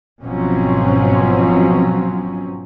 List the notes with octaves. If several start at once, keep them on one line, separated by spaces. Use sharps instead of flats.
G#1 B2 F3 F#3 C4 C#4